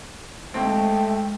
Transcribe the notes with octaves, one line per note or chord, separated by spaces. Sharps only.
D#2 G#3 A3 C4 G5